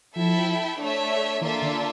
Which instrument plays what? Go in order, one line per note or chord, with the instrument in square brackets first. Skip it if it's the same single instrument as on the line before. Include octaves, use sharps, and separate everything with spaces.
[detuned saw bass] F3 [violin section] E4 A4 E5 G5
[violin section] A3 D4 A4 C#5 E5
[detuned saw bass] E3 [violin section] A#3 D4 F4 A4 E5
[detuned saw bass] D3